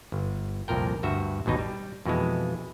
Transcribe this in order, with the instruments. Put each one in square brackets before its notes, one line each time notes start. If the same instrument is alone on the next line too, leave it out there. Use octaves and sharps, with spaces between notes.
[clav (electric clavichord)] G1
C2 F2 A#2 A#4 G5
D2 G2 F#4 E5
A1 D#2 B2 D#4
G3
F2 B2 E3 G#3